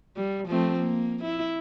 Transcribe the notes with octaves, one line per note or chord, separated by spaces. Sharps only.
G3
F3 A3 C4
A#3
E4